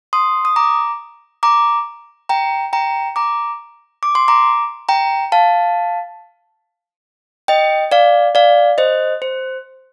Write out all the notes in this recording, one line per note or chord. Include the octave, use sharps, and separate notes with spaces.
C6 D#6
D#6
A#5 D6
A#5 D6
G5 A#5
G5 A#5
A#5 D6
D6
C6
A#5 D6
G5 A#5
F5 A5
D#5 G5
D5 F5
D5 F5
C5 D#5
C5